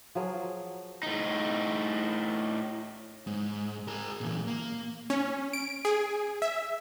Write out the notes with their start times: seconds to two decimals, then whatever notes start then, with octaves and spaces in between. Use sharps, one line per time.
0.15 F3 F#3 G#4 A#4
1.03 A2 D#4
3.27 G#2
3.88 G#4 A#4
4.21 A#2 E3
4.47 A#3
5.10 C#4
5.53 D7
5.85 G#4
6.42 E5